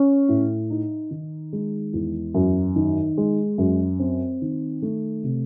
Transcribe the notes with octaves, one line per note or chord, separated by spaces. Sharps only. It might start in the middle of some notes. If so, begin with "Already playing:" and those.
Already playing: C#4
A2
D#4
D#3
G#3
E2
F#2
D#3
G#3
F#2
C4
D#3
A3
C3